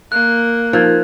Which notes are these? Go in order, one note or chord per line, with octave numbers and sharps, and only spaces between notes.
A#3 F#6
F3 D#4 A#4 G#6